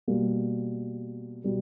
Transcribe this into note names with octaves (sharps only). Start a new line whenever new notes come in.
B2 G3 A#3
B2 G3